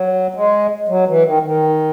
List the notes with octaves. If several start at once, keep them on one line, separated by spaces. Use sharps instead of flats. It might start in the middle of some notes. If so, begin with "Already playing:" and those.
Already playing: F#3
G#3
F#3
E3
D#3
D#3